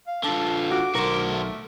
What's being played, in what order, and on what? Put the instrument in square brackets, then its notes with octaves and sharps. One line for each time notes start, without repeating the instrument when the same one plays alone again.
[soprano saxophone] F5
[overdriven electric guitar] D3 F4 [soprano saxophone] A5
[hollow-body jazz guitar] F#4 [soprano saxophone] D6
[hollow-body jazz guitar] B1 A#4 [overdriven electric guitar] F#4 C5
[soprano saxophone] A3